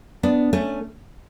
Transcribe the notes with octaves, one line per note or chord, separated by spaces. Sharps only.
B3 D4
A3 C#4